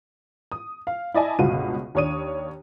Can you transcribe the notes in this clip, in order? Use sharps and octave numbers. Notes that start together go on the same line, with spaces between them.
D#6
F5
E4 D5 D#5 G#5 A5
G1 C#2 B2 F#4 F5 D#7
D#2 D4 C#5 D#6 D#7